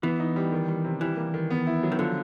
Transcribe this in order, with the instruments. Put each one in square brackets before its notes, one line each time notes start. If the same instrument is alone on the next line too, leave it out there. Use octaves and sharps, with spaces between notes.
[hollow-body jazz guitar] E3 [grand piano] B3
[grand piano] D#4
G3
D#3
G3
C3
[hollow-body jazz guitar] E3 [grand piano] G3
[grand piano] A#3
D#3
B3
E4
F#3
[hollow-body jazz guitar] D#3
[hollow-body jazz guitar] D3 [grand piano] F3